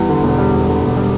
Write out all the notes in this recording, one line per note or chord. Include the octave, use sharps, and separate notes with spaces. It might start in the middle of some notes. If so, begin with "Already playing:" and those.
Already playing: E2 G3
D3
E1
G3
E2
D3
E1
G3